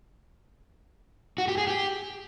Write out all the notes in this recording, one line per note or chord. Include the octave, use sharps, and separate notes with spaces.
F#4
G4
G#4
G4